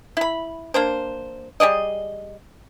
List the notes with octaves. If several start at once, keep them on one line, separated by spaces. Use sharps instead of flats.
E4 B5
A#3 D4 C5
G3 G#4 D5 D#5